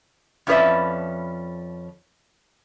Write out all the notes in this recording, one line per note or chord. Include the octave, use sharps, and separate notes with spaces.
F2 F3 C#4 B4 D5 E5